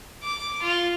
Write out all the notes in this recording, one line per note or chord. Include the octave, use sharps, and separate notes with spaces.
D6
F4